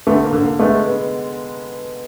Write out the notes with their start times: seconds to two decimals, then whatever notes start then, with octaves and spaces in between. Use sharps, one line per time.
0.07 D3 A3 B3
0.24 A#3
0.33 D3
0.42 A#3
0.59 G#3 A3 B3
0.85 B3